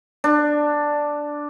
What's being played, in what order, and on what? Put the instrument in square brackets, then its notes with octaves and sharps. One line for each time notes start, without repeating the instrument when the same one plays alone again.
[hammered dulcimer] D4